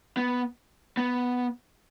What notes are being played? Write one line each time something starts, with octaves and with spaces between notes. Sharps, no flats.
B3
B3